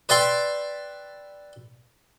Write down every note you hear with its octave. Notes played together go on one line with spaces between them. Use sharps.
B4 D5 E5 G5 C6